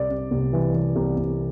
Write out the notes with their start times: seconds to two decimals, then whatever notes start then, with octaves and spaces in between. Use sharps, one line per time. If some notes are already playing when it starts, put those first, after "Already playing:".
Already playing: C2 C3 D5
0.10 C3
0.31 C2
0.53 E3
0.74 E3
0.96 C2
1.17 C2